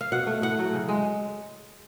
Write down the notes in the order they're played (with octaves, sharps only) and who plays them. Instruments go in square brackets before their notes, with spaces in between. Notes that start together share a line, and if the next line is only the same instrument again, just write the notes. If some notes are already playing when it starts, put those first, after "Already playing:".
[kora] F5
B2 F#5
A3
A2 F#5
F#3 A3
C#3
G#3